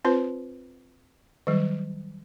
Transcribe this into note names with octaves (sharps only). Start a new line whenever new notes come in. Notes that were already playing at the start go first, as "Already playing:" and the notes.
C4 F4 B4 C5
D#3 F#3 G3